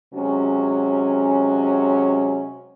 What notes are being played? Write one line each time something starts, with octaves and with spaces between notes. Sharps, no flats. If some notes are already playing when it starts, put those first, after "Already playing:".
C3 F#3 G#3 C#4